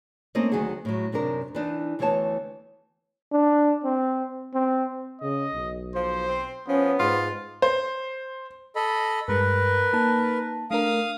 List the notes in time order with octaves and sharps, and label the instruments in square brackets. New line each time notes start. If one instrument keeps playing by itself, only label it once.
[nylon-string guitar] A3 A#3 C4 C#4 D#4 D#5
D2 D#3 F#3 G#4 F#5
A2 F#3
F#2 C3 D#3 D4 A#4
E3 D4 D#4
D2 E3 A3 B3 C#5 A5
[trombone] D4
C4
C4
[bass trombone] C#3 [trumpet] D#5
[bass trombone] B1
[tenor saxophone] F3 [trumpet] C5
[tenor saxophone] C4
[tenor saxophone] F3 [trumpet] B3 [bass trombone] C#4
[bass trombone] G#2 [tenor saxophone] F4
[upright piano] C5
[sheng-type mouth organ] A4 D#5 B5
[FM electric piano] G2 G#3 [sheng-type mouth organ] A#4 B4
[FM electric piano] A#3 D#4 A5
[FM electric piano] A3 D4 A#4 [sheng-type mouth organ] F5 D#6